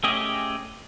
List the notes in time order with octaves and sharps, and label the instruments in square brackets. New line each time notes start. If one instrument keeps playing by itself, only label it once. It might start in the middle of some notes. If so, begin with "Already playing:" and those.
[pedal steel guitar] A3 C#4 G4 G#4 D#5